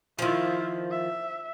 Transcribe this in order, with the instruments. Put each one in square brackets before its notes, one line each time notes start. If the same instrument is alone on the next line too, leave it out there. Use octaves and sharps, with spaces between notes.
[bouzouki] D#3 F3 [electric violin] E4 F4
[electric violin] E5